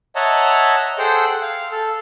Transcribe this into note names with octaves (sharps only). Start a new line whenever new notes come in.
C#5 D#5 E5 F#5 A5 A#5
G#4 A4 C5 F#5 G5
F5
A4